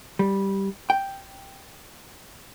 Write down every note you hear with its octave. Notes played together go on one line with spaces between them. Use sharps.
G3
G5